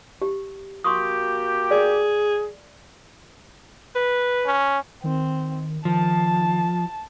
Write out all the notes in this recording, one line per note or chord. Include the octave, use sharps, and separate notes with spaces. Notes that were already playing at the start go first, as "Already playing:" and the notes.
G4
A#3 F#4 G4 C6 C#6 D#6
G#4 D5
B4
C#4
D#3 C4
D#3 F3 A5